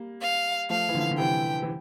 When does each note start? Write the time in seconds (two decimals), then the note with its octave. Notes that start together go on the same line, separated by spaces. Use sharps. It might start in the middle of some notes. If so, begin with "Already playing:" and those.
Already playing: G3 A#3
0.22 F5
0.70 F3 A3 F5
0.89 E3
0.95 D3 F3
1.11 D3
1.18 C3 E3 G5
1.63 E3